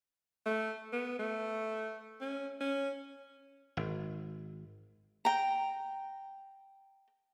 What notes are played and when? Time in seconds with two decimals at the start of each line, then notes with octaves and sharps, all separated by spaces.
0.46 A3
0.93 B3
1.19 A3
2.21 C#4
2.60 C#4
3.77 G#1
5.25 G5 A#5